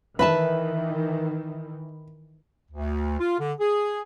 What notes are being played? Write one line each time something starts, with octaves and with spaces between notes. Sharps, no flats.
D#3 E3 B4 E5 A5 B5
D2
F4
D3
G#4